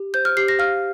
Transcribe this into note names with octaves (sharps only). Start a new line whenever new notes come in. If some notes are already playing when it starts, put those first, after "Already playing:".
Already playing: G4
C5 G6
F6
G4 C7
A#6
F5 F6